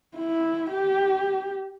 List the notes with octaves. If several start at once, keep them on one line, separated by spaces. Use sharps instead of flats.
E4
G4